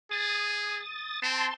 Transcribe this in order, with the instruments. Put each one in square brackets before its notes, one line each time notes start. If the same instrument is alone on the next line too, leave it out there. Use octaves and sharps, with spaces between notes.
[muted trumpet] G#4 [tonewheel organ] D#6 A6
[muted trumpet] C4 [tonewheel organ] A5 C6